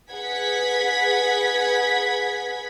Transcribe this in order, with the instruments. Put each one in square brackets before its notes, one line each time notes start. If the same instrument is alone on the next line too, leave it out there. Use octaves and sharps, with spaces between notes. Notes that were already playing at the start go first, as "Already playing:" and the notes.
[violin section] G#4 B4 F#5 G#6 B6